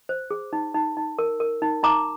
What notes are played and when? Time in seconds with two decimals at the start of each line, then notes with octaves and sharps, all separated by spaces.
0.09 C5
0.31 G#4
0.53 D#4
0.74 D#4
0.97 D#4
1.19 A#4
1.40 A#4
1.62 D#4
1.83 D#4 A#5 D6